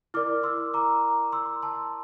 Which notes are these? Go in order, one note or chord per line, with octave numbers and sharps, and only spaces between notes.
E4 A#4 D5 D6 F6
C6 E6
A#5 D6
C6 E6
A5 C6